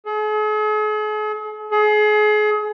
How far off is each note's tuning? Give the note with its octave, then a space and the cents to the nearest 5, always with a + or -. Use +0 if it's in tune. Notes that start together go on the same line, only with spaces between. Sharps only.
G#4 +45
G#4 +35